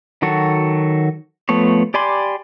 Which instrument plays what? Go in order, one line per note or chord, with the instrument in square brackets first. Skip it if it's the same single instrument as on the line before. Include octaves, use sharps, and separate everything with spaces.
[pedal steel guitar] D#3 F#3 F#4 A4
F3 A3 B3 C#5
G4 D5 G#5 B5 C6